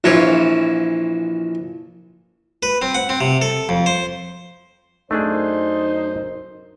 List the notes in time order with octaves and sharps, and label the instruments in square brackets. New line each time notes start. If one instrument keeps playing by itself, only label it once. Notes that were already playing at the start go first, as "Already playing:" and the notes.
[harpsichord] A#1 E3 F3 C#5
B4
C4
F#5
C4
C3
A4
F2
C5
[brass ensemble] F#2 A#4 C5 [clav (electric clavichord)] A3 D4 G#4 [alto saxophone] D#4